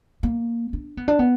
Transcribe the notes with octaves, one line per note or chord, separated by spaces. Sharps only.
A#3
D4
B3
D4
B3